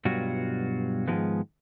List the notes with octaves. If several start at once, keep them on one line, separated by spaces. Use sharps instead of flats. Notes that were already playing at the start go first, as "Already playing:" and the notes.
G2 B2 F#3 G3 F4 F#4
G#2 D#3 F3 G#3 B3